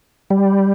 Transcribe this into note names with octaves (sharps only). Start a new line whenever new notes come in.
G3